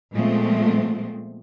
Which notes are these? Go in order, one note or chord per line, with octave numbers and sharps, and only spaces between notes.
A#2 F3 G#3 A3 B3 C4